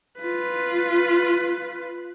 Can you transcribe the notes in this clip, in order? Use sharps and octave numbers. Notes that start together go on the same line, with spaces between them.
F4 B4